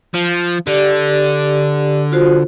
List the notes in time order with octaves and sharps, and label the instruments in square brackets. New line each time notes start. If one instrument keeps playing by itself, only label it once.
[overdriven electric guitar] F3
[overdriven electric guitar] D3 [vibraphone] G4 D5
[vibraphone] F4 F#4 C5